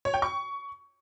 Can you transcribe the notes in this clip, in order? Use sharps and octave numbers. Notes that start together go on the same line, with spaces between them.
C#5
G5
C#6